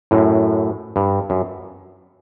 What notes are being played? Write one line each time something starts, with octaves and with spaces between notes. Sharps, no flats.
F#2 A2
G2
F#2